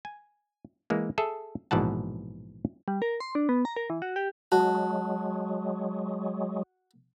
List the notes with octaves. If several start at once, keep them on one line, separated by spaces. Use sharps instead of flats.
G#5
E3 G#3 A#3
G#4 A4 E5
A#1 G#2 B2 E3 F#5 A5
G3
A#4
C6
D4
B3
A#5
A#4
E3
F#4
G4
F#3 G#3 F#4 A5